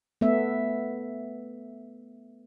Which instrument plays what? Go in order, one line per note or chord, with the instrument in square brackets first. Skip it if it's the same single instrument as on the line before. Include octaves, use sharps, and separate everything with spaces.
[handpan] A3 B3 E5